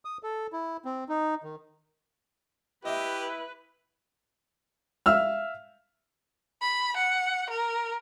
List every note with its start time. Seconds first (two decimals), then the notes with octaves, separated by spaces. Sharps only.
0.05 D#6
0.23 A4
0.53 E4
0.85 C4
1.09 D#4
1.44 D#3
2.85 E4 G4 B4 D#5 E5
5.06 E5 F5 E6 F6
6.62 B5
6.97 F#5
7.50 A#4